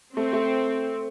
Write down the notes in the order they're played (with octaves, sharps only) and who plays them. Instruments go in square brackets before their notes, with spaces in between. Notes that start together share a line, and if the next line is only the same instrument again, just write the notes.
[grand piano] A3 [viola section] C4
[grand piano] A3